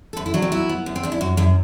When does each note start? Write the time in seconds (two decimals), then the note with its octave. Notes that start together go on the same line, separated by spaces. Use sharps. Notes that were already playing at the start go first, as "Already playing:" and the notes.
0.13 A4
0.17 F#2 B4
0.26 E4
0.34 F#3 D4
0.42 C4
0.52 B3 E4
0.69 B3
0.86 F#2
0.96 C4
1.03 F#2 D4
1.12 E4
1.21 F#2 F#4
1.37 F#2 E4